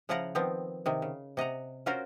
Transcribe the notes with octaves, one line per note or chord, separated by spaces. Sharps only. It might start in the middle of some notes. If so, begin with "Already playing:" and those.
C#3 F3 E4 F4 F#5 A#5
D#3 F3 B3 C4
C3 D#3
C#3
C3 D#5 F#5 A#5
C#4 F4 F#4 A#4 C5